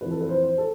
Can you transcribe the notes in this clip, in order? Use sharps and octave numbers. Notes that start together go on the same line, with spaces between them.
F2 E3 B4
A4
B4
C5
C5
A4